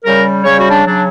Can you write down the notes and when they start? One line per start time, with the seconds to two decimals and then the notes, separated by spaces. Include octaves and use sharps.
0.04 C#3 G3 A#4
0.44 C#3 G3 C#5
0.58 F#4
0.70 D4
0.84 C#3 F#3 D4